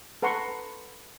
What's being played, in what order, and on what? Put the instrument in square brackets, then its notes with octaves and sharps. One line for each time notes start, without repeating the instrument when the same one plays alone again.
[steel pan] A4 B4 F#5 A#5 C6 C#6